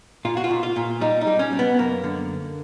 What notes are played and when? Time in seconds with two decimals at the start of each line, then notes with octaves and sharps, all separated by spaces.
0.25 A#2 F4
0.37 F#4
0.44 F4
0.51 A#2
0.63 F4
0.76 A#2
1.01 G3 D#4
1.21 D#4
1.27 G3
1.39 C#4
1.53 G3
1.59 B3
1.78 F#2 A#3
2.04 D3